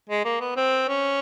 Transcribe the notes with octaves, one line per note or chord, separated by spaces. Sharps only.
G#3
A#3
B3
C4
C#4